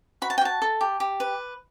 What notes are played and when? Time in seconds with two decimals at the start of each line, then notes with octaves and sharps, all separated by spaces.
0.22 F#4 B5
0.30 A5
0.38 G5
0.41 F#4 A5
0.62 A4
0.81 G4
1.00 G4
1.20 B4